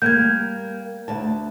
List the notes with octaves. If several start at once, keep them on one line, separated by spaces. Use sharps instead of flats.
G3 A#3 G6 G#6
D2 A5